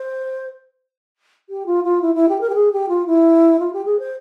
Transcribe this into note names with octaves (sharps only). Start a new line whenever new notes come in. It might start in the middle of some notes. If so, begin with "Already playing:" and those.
Already playing: C5
G4
F4
F4
E4
E4
G4
A#4
G4
G#4
G4
F4
E4
F4
G4
G#4
C5